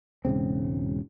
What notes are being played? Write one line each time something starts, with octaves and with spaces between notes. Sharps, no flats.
E1 G#2 C#3 C4